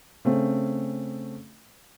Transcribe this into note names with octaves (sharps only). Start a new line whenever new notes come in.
C#3 A3 C4 C#4